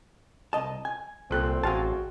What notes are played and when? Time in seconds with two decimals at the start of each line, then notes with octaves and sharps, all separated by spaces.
0.53 C2 D#5 A5
0.85 G#5
1.31 C2 A#2 C4 A4 F#6
1.63 A1 F#4 G#4 F5 G5 A5 C6